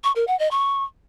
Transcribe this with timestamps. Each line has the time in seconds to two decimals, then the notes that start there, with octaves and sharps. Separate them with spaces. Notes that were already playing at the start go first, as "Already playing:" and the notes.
0.04 C#6
0.15 A#4
0.27 F#5
0.39 D#5
0.51 C#6